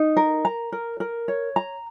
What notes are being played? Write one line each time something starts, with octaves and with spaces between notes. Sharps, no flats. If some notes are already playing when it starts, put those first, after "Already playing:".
Already playing: D#4
A#4
A#5
A#4
A#4
C#5
A#5